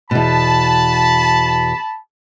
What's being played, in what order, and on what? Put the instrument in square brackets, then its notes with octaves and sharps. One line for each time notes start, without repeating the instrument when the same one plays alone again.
[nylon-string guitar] E2 B2 [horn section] A5 B5